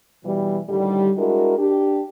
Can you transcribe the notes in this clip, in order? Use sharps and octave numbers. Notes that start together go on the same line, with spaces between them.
B2 E3 G3
A2 D3 D#3 G3
G#3 D4 E4 F#4 A#4
D4 G4